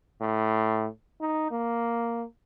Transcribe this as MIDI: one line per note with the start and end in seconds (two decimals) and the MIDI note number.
0.21 0.87 45
1.21 1.50 63
1.51 2.24 58